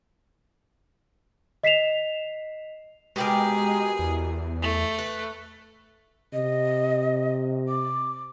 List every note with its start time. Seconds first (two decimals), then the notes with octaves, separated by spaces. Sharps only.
1.64 D#5 B6 C7 E7 F7
3.16 B2 G#3 G4 G#4 A#4
3.99 E2
4.62 A3
4.99 B4
6.33 C3 D#5
7.68 D6